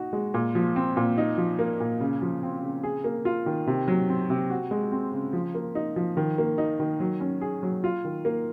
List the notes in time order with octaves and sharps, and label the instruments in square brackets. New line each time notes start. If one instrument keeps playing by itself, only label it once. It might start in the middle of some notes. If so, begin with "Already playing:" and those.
Already playing: [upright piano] D#4 F#4
G#3
A#2
F3
C4
A#2
D#4
F3
A#3
A#2
C#3
F3
C4
C#3
G#4
A#3
F4
D#3
C3
F#3
C4
C3
F#4
G#3
C4
C#3
F3
A#3
D#4
F3
D#3
A#3
D#4
D#3
F#3
C#4
G#4
F#3
F4
D#3
A#3